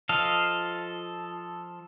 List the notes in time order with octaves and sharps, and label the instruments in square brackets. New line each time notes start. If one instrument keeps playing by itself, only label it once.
[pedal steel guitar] F3 A4 D#5 F5